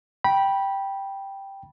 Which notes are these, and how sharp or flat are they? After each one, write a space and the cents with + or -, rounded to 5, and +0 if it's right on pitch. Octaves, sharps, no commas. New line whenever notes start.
G5 +0 B5 -20